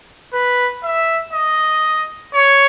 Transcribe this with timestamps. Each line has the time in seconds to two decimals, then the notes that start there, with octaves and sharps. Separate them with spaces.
0.33 B4
0.83 E5
1.33 D#5
2.35 C#5